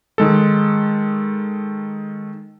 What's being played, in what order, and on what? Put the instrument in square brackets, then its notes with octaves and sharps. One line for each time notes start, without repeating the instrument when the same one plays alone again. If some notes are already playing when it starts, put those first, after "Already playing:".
[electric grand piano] D#3 G#3 A4